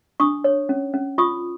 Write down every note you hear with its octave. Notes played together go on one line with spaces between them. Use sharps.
D4 C#6 D#6
C#5
C#4
C#4
F4 C#6 D#6